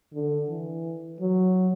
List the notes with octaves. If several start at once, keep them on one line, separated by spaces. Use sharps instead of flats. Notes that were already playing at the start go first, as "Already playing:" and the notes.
D3
E3
F#3